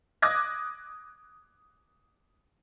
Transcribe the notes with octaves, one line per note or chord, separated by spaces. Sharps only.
D6 D#6 F#6 G#6 A#6